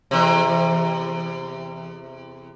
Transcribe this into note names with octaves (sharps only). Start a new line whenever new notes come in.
E2 C3